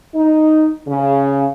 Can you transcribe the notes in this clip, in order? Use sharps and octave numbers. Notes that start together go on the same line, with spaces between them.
D#4
C#3